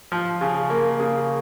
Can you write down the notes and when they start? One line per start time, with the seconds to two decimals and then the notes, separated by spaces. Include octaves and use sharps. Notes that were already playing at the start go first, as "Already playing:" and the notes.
0.12 F3
0.41 C#3
0.70 A#3
1.00 C#3